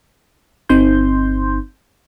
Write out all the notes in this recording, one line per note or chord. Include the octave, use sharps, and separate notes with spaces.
G1 C4 D#4 C6 G6